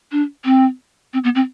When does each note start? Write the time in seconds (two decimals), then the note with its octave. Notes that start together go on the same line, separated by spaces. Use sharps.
0.12 D4
0.45 C4
1.13 C4
1.24 B3
1.35 C4